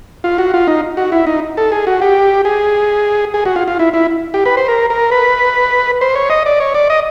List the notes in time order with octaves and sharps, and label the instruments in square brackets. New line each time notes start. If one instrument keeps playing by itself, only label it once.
[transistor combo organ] F4
F#4
F4
D#4
F#4
E4
D#4
A4
G#4
F#4
G4
G#4
G#4
F#4
F4
F4
E4
E4
G4
B4
C5
A#4
A#4
B4
C5
C#5
D#5
D5
C#5
D5
D#5